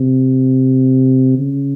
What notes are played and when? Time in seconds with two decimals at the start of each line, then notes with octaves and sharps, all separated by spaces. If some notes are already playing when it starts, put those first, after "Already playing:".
Already playing: C3
1.39 C#3